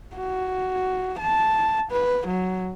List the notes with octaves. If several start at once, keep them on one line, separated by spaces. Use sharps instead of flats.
F#4
A5
B4
F#3